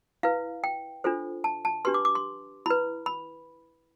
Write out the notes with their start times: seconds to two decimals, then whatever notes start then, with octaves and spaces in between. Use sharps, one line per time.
0.23 E4 B4 F5
0.64 G5
1.04 D4 F4 A4 C5
1.44 A5
1.65 A5
1.85 D4 G4 B4 C6
1.94 D6
2.05 D6
2.15 C6
2.66 E4 B4 B5
3.06 B5